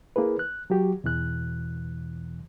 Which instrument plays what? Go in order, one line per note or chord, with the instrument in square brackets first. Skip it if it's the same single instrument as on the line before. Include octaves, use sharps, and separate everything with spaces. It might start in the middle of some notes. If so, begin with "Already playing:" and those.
[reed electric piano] A#3 E4 G#4 B4
F#6
F#3 F#4 G4
E2 B2 E3 F#6